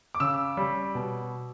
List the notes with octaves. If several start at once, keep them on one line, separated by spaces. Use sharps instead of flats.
D6
C#3 E6
G3 C#4
B2